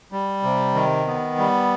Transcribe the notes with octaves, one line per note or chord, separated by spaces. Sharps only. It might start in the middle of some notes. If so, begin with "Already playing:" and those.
G3
C3
D#3
B3
G3